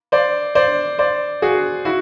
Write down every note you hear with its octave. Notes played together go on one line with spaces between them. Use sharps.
C5 D5
C5 D5
C5 D5
F#4 G#4
E4 F#4